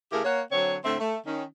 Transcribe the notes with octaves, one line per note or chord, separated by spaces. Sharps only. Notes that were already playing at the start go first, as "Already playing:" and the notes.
C#3 A3 E4 G4 G#4 A#4
A#3 C#5 F#5
D3 F#3 C4 C#5
A2 D3 A3 C4 E5
A3
D#3 C#4